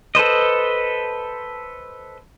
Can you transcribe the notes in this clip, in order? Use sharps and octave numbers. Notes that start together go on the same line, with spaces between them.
A4 B4 C5 D#5